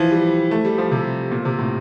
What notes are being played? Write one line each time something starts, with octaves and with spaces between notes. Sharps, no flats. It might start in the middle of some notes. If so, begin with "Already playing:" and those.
Already playing: E3 F3
G3
A3
G3
F3
C3
A#2
C3
A2